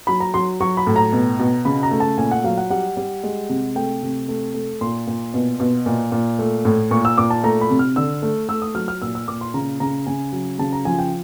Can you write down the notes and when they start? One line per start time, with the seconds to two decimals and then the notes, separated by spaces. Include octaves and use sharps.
0.07 F#3 B5
0.20 A#5
0.34 F#3 C6
0.60 F#3 C#6
0.77 B5
0.87 A2
0.96 A#5
1.13 B2
1.39 B2
1.65 C#3 B5
1.83 A#5
1.91 A3
2.00 A5
2.18 A#2 G#5
2.31 F#5
2.44 F#3 F5
2.58 F#5
2.70 G3 F#5
2.97 G3
3.23 G#3
3.49 C3
3.75 A3 G5
4.02 C3
4.28 A3
4.54 A3
4.81 A#2 C6
5.07 A#2
5.34 B2
5.60 B2
5.86 A#2
6.12 A#2
6.39 A3
6.65 A2
6.91 A#2 C#6
7.05 E6
7.18 A#2 D6
7.30 A5
7.44 A3 A#5
7.61 B5
7.70 C3
7.79 F6
7.96 D3 E6
8.22 A3
8.49 A3 E6
8.62 D#6
8.75 F#3 F6
8.88 F6
9.02 A#2 E6
9.15 E6
9.28 A#2 D6
9.41 C6
9.54 C#3 A#5
9.80 C#3 A#5
10.07 C#3 G#5
10.33 F#3
10.59 C#3 A5
10.73 A#5
10.85 F3 G#5
10.99 G5